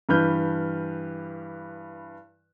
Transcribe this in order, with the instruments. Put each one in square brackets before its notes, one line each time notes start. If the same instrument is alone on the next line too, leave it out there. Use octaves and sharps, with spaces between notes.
[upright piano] G2 E3 B4 F6 G6